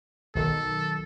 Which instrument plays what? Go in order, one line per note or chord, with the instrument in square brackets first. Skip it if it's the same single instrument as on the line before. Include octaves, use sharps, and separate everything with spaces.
[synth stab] B1 D#3 [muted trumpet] A4